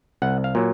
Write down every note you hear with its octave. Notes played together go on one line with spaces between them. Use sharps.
C2 F#5
F5
A#2 F#3